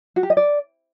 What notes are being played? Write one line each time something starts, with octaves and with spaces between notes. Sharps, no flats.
F#4
G4
D#5
D5